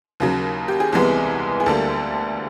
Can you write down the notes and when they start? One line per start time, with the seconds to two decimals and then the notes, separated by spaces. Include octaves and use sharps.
0.20 D#2 C#3 F#3
0.68 G4
0.80 G#4
0.93 C2 C3 E3 G#3 B3
1.60 G#4
1.66 D2 D3 G3 A#3 A4